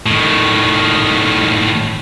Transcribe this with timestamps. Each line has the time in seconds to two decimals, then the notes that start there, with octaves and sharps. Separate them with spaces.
0.06 A2 D#3